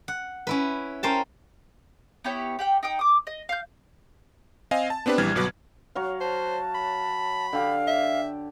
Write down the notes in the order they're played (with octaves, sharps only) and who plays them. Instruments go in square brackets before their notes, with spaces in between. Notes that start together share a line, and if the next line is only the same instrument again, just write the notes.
[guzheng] F#5
C#4 E4 B4
C#4 A#4 C5 G5 A5
[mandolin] B3 E4 G4 C#5
G4 F#5 G5
D#4 G5 D#6
D6 D#6
D#5
F5 G6
[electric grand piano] C4 D#5 F5 G#5
A5
B3 C4 D4 G4 B4
A#1 E3 G3 F6 G#6
G1 B2 F#3 B4 D6
[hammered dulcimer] F#3 C#5 F5
[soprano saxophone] C5 [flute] A5
[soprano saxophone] B5
[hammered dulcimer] D3 G4 [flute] F5
[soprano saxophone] E5